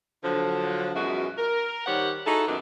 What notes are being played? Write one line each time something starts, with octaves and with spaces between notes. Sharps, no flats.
D3 F3 F#3
F#2 B2 E3 G#3 F4 F#4
A#4
D#3 G3 G4 C5 C#5 F#5
D#4 E4 F#4 G#4 A4
F#2 A#2 D#3 B3 D4